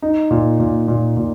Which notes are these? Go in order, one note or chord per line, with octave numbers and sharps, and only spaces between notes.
D#4
A#2
A#2
A#2
A#2